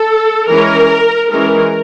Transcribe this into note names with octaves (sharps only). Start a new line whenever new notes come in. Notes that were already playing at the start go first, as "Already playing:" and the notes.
Already playing: A4
E3 G#3 C#4 A#4
E3 G#3 C#4 A#4